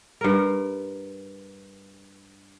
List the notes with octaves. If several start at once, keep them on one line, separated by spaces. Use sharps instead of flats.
G2 A#4